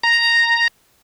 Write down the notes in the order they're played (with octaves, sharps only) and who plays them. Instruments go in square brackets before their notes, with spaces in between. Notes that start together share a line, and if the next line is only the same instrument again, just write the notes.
[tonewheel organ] A#5